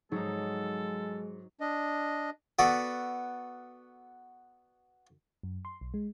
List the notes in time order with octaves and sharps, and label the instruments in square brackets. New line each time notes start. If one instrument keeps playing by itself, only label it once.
[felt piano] G#2 [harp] F#3 D#4 [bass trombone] G#3 [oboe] A4
[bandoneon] D4 D#5
[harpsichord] B3 F#4 A4 B4 D5
[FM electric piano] F#2
C6
B1
G#3